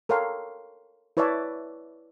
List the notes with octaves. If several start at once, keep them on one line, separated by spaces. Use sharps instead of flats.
A4 A#4 C#5 F5 G5 C6
E4 B4 C#5 D5 E5 A5